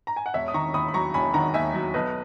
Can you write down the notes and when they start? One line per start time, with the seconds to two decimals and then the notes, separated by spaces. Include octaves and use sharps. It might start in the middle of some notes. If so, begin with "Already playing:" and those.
0.07 A#5
0.16 G#5
0.26 F#5
0.34 E1 C#5 E5
0.48 D#6
0.54 D#3 A#5 C#6
0.74 D#2 B5 D#6
0.88 B5
0.94 F#3 A#5 C#6
1.14 E1 G#5 B5
1.34 D#3 F#5 A#5
1.54 D#2 E5 G#5
1.74 F#3
1.94 B1 B4 D#5